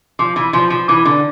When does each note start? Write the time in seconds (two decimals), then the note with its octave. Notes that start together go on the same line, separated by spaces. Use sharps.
0.19 F3 D6
0.36 E3
0.53 F3 D6
0.70 F3
0.88 E3 D6
1.05 D3